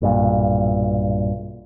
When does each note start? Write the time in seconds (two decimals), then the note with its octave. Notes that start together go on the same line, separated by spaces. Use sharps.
0.02 B1 G2 A#2